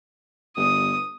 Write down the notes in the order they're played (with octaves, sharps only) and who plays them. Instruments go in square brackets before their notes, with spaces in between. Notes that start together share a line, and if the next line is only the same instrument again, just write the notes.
[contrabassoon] G1 [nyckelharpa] D#6